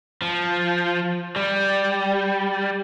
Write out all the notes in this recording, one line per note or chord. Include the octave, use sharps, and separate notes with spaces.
F3
G3